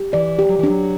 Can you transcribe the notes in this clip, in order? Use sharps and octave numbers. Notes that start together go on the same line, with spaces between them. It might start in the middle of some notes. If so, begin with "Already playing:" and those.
Already playing: G4
E3 D5
G4
F#3
E3 D4
F#3